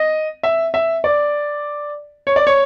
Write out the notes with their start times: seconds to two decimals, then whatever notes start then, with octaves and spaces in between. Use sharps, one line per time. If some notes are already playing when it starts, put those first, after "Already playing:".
Already playing: D#5
0.43 E5
0.74 E5
1.04 D5
2.27 C#5
2.36 D5
2.47 C#5